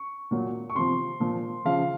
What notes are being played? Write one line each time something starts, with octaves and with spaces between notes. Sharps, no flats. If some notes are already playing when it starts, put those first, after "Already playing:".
Already playing: C#6
A#2 F#3
C#6
C3 F3 C6
A#2 F3
C#3 F3 F5